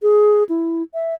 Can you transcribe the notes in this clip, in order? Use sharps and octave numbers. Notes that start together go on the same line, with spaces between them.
G#4
E4
E5